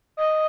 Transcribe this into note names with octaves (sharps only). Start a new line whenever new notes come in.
D#5